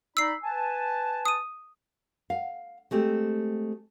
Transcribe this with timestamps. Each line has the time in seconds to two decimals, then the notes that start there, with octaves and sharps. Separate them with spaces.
0.17 D#4 D5 B5 E6 C7
0.43 B4 G#5 A5
1.25 D#6 D#7
2.30 F5
2.91 G#3 A3 C4 G4